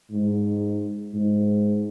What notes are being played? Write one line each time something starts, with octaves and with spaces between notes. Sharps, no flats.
G#2
G#2